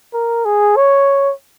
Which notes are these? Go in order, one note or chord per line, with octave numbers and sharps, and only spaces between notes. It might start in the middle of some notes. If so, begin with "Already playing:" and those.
A#4
G#4
C#5